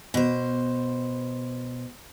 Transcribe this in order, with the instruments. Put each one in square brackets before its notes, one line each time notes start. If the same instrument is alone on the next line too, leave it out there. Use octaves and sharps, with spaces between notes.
[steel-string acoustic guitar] B2 C5